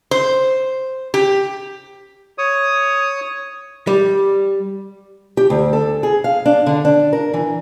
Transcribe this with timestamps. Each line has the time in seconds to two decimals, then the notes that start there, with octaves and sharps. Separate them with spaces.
0.11 C5
1.14 G4
2.38 C#5 D#6
3.87 G3
5.37 G4
5.50 D2
5.73 A4
6.03 G#4
6.24 F5
6.46 D4
6.66 D3
6.85 D4
7.13 A#4
7.34 E3